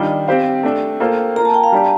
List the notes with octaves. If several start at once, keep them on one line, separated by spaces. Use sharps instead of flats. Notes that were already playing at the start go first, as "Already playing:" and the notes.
Already playing: D#3 G3 D4 F4 G5
C4 G4 C5 F5
A3 D4 A4
A#3 F4 A4 C5 F5
A#3 F4 A#4 A#5
A5
G5
F5
G3 D4 G4